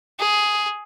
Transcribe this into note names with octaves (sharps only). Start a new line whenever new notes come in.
G#4